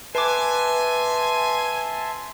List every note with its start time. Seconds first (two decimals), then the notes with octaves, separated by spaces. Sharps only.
0.15 B4 E5 G#5 A5 C6 D6